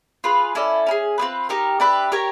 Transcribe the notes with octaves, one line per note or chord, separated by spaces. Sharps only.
F4 G#4 B4
C#4 E4 A4 D5
C#4 E4 G#4
C4 F4 G#4 B4
D#4 G4 A#4
D4 G4 B4 E5
G4 A#4 C#5